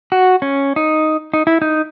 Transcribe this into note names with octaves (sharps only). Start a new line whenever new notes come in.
F#4
C#4
D#4
D#4
E4
D#4